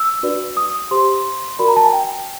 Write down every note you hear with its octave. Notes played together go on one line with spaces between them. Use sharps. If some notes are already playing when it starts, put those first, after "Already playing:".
Already playing: E6
D4 F#4 B4 D5
D#6
G4 C5 C6
F#4 A#4 D5 B5
A#5
A5
G#5
G5